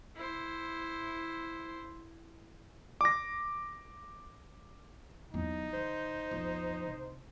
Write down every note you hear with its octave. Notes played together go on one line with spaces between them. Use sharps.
E4 C5
D6 A#6
E2 F#3 D#4
D3 C5
B1 F2
C2